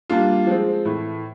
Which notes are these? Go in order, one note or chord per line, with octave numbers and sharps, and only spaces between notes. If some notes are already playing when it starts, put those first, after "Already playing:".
G3 A#3 D4 F4
F3 G#3 C4
A2 E3 A3